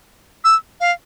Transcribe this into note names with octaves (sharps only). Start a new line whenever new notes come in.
E6
F5